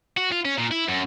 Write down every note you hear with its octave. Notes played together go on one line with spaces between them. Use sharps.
F#4
F4
C#4
A#2
E4
F#2